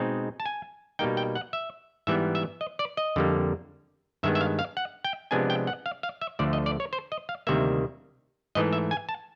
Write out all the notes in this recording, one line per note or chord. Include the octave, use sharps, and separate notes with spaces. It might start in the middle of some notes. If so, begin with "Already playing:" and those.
Already playing: B2 G#3 C4 D#4
A5
G#5
B2 G3 A#3 D#4 G5
G5
F#5
E5
G#2 E3 G3 B3 E5
E5
D#5
D5
D#5
F2 D3 G3 A#3
G2 D#3 G#3 B3 E5
E5
F5
F5
F#5
G5
C3 F3 G#3 B3 D4 G#5
G5
F#5
F5
F5
E5
D2 D3 F3 A3 D5
D#5
D5
C#5
C5
D#5
F5
D2 C3 D#3 G3 A#3 E5
G#2 E3 A3 D#5
E5
G#5
A5